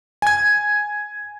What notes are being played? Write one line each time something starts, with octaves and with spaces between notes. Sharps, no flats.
G#5 G#6